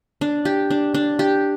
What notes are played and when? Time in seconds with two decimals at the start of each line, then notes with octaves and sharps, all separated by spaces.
0.21 D4
0.45 G4
0.70 D4
0.94 D4
1.19 G4